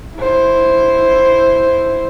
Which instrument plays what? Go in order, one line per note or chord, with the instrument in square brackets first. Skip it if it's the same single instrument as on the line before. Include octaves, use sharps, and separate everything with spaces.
[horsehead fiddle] E4 C5